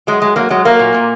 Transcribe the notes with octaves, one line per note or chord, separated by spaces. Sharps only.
F#3 G#3
F#3 G#3
F#3 A#3
F#3 G#3
F#3 A#3
A#2
A#2